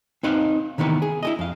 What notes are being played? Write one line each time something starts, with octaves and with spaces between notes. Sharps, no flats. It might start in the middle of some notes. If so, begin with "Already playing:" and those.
C4 D#4 B4 D#5 F5
C3 D#3 E3 B3 B4
G#4
E4 G#4 D#5
F2 F5